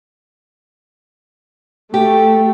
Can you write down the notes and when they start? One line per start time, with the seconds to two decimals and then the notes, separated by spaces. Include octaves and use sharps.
1.94 A3 G4